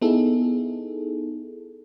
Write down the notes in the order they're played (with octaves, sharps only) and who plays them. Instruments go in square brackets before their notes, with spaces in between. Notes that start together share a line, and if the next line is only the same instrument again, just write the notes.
[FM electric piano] B3 D#4 E4 G#4 A4